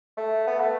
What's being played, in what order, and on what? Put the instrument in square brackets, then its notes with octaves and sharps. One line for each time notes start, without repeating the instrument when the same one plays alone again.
[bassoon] A3
B3
A3